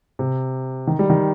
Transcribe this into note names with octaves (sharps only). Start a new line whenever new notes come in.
C3
D#3
G3
D#3